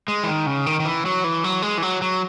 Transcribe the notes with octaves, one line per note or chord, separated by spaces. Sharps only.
G#3
E3
D#3
C#3
D#3
D#3
E3
F#3
E3
F#3
G#3
E3
F#3
F#3